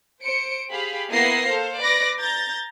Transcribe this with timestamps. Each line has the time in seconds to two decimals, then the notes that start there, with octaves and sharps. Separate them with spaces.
0.22 C5 C#7 D7
0.70 G4 G#4 F5 B5
1.12 A#3 B3 E4 D#6 A#6 C7
1.48 A4 C5 F5
1.79 B4 D5 D6 A#6
2.19 A#5 G6 A6 A#6